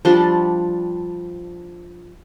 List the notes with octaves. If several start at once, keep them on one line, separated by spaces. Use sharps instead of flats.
F3 G3 D4 C6